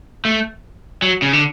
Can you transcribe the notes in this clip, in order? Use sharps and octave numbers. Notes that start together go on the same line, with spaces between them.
A3
F#3
C#3
D3